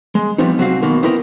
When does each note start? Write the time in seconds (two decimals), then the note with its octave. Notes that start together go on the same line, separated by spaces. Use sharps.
0.15 G#3
0.38 F3 G3 B3 C4 D#4
0.58 C2 F#3 C4 F#4 F5
0.82 B2 D#3 A#3
1.03 B3 C4 E4 A#4 F#5 G5